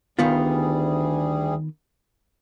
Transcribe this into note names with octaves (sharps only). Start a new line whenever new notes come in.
D2 D#3 G3 B3 F4 G#4